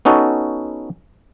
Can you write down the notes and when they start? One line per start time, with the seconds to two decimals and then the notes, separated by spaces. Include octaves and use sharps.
0.05 B3 C#4 D#4 F#4 A4